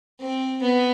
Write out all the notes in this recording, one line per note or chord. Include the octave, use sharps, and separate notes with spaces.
C4
B3